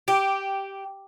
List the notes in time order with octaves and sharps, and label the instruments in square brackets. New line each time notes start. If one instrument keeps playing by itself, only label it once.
[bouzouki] G4